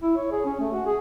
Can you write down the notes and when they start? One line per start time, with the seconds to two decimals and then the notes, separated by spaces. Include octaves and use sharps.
0.02 E4
0.17 C#5
0.32 G#4
0.45 C#4
0.60 A3
0.73 F#4
0.86 G#4